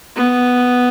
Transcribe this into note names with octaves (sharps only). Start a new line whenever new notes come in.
B3